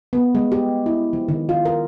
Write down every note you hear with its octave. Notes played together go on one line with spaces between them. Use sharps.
B3
G#3
G4
E4
F3
D#3
F4
A#4